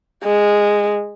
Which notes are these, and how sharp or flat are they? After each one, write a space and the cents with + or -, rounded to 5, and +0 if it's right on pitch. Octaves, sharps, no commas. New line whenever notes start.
G#3 -10